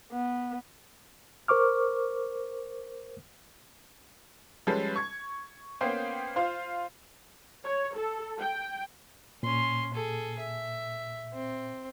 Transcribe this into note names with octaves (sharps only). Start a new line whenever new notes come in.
B3
A#4 C5 C#6 D6 F6
F3 G3 G#3 C#4 A4 B4
C#6 G#6
A#3 B3 C#4 C5 F5 G5
F4 C5 F5
C#5
A4
G5
A#2 C#4 C6
G#4 A4
E5
C4